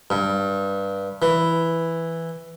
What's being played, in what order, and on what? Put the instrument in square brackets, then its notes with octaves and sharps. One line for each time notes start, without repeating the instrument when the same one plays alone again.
[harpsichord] G2
E3